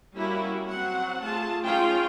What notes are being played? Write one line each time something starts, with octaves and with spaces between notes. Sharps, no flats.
G3 A#3 C#4 E4 F#4
F#3 C4 F#4 F#5
A3 F4 G#4 A5
C#4 D#4 F4 G#4 G5